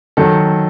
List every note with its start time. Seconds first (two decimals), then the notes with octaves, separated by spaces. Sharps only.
0.17 D#3 F#3 A4